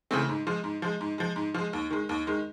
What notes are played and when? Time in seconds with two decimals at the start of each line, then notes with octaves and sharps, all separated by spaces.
0.11 C#3 E3 A3 C4
0.29 G#2
0.47 F3 G#3
0.64 G#2
0.82 F3 G#3
1.01 G#2
1.18 F3 G#3
1.36 G#2
1.54 F3 G#3
1.73 D#2
1.91 D#3 G#3
2.09 D#2
2.27 D#3 G#3